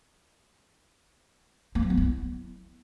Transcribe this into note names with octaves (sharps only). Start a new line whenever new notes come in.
A#3
F#3
B3
E4